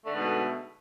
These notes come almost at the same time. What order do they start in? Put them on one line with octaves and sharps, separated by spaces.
A3 D3 G#2 B3 B2